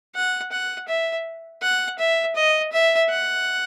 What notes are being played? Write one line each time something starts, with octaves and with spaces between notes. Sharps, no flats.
F#5
F#5
E5
F#5
E5
D#5
E5
F#5